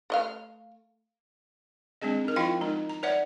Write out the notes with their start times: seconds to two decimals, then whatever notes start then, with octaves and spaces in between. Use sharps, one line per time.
0.10 A3 D#5 F5
2.01 G#3 C4 D4 G#4 D#5
2.24 D#4 A#4
2.36 F3 E4 F4 D#5 F5 G5
2.61 G#3 D#4 A#4
2.90 A#5
3.03 B4 C#5 D5 E5 F#5